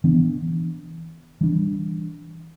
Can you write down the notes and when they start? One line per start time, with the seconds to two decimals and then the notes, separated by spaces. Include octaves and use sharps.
0.04 E3 B3 D4
1.41 E3 G3 D4